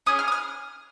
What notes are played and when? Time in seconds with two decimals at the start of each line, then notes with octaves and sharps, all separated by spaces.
0.06 C#4 G#4 D#6
0.19 F6
0.28 D#6
0.32 F6